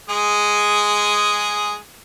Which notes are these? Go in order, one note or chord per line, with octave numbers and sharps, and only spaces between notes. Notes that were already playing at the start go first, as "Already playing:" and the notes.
G#3 G#4